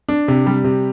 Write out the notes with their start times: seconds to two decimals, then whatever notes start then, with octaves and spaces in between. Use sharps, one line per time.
0.09 D4
0.28 C3
0.46 G3
0.65 C3